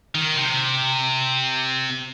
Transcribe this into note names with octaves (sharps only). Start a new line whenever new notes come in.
D#3
C3